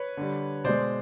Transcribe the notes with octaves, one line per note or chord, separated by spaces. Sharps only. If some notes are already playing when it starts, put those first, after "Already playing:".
Already playing: B4 C#5
D3 G3
B2 G#3 C5 D5